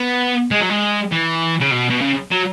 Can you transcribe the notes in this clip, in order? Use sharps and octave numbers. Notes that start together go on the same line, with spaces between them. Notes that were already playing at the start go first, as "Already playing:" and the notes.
Already playing: B3
G#3
F#3
G#3
E3
C#3
B2
B2
C#3
F#3